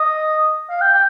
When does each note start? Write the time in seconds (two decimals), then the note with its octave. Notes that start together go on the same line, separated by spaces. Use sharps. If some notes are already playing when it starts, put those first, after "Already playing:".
Already playing: D#5
0.70 F5
0.81 G5
0.94 G5